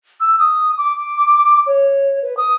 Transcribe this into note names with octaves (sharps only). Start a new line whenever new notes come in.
E6
D#6
D6
C#5
B4
D#6